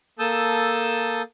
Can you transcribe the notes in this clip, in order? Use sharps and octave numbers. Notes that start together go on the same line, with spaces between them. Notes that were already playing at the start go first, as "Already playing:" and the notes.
A#3 A4 A5 D#6 E6 G6